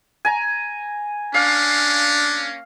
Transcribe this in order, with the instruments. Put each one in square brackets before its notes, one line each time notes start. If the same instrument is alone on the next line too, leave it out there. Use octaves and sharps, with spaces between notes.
[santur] G#5 A#5
[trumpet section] A#3 C#4 [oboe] D4 [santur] F5